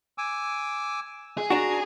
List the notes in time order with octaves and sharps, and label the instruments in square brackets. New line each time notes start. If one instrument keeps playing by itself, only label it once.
[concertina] G#5 D6 E6
[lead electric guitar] G#4
[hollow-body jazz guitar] D4 F#4 [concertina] A#5